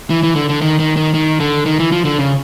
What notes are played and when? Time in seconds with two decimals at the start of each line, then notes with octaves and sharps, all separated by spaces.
0.10 E3
0.23 E3
0.35 D3
0.49 D3
0.61 D#3
0.79 D#3
0.97 D#3
1.14 D#3
1.40 D3
1.66 D#3
1.80 E3
1.92 F3
2.05 D3
2.19 C#3